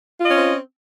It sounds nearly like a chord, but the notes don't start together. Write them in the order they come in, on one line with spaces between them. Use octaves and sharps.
F4 D#5 C#4 C4